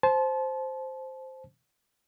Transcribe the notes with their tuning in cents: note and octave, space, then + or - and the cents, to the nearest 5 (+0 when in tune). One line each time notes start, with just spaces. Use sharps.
C5 +0 A5 -30